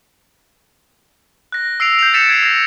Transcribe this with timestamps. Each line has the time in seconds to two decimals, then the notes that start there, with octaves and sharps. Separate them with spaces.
1.52 F#6 A#6
1.80 E6 C7 D7 F7
1.99 G6 C7 F7
2.14 G6 A6 B6 C#7 D7 E7
2.29 G#6 A6 C7
2.43 E6 A#6